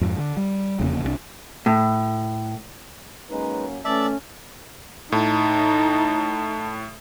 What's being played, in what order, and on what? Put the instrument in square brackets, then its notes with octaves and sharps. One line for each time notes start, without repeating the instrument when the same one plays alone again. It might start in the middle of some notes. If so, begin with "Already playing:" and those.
[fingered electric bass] F2 G#2
D3
G3
F1 E2 C#3 A#3
C2 F#3 D4
[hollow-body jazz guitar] A2
[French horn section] F#3 A#3 C#4 [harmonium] G#3 D#4 B4
[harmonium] E3 [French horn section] A3 [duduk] C#4 [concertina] D5 E5 A5
[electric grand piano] A2 [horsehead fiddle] D#4 [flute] A5